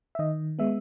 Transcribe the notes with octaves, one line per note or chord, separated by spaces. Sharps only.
E5
D#3 D#5
G#3 B3 E5